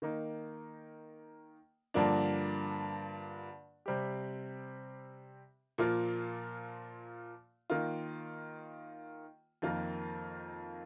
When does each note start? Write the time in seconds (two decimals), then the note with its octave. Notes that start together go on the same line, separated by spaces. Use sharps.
0.02 D#3 A#3 D#4
1.94 G2 D3 F3 A#3 D4
3.86 C3 G3 C4 G4
5.78 A#2 F3 A#3 F4
7.70 D#3 A#3 F4
9.62 F2 D#3 A#3 F4